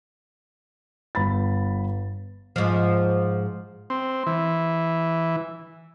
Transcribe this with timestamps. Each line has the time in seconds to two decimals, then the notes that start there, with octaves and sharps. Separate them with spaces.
1.15 G1 B5 A6
2.56 G#2 F3
3.90 C4
4.26 E3